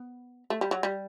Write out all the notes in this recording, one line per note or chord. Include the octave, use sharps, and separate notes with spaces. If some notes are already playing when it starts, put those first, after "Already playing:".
Already playing: B3
A3
G3
F#3
G3